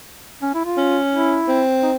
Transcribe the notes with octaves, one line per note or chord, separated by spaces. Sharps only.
C#4
E4
F4
C#4
E4
C4
D#4